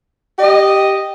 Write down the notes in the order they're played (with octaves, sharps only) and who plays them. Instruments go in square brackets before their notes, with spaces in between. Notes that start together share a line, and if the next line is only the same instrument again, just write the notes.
[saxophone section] G4 D#5